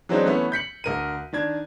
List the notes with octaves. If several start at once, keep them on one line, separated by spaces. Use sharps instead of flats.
E3 F#3 G#3 C4 D4 D#4
E3 A3 B3 C#4
G6 B6 C#7 F#7
D2 A#4 D#7
D#3 D4 G#6